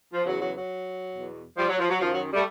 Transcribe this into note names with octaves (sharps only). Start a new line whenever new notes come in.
F3
E2 C#3 E3 F#3
F#3
F#3
E2 B2
F3 G3
F#3
F3
F#3
F#2 D#3 F3
F#3
G3 A3